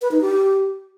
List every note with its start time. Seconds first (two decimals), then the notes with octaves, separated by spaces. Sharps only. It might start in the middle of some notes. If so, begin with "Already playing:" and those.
0.02 B4
0.11 D#4
0.21 G4